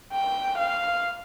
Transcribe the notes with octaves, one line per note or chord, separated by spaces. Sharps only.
G5
F5